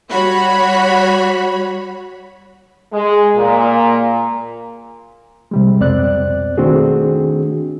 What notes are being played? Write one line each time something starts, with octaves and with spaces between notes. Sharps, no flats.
G3 F#4 C#5 B5
G#3
A#2
C3 G3 G#3
C2 F2 B2 C4 D5 F#6
D#3 A3 C4 D4 F#4 G#4